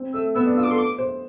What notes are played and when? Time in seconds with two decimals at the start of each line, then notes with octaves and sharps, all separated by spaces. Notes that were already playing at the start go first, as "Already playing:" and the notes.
Already playing: C4
0.13 A3 E6
0.35 B3 E6
0.46 D4
0.57 F4 E6
0.64 D6
0.67 A4 C6
0.78 D6
0.98 C5